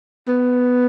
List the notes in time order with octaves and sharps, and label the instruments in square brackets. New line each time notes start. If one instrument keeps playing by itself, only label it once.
[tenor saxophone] B3